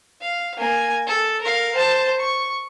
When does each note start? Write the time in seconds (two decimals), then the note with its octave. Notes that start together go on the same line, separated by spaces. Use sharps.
0.21 F5
0.57 A#3 G#5
1.07 A4
1.41 A#4 F5
1.75 C5 A5
2.20 C#6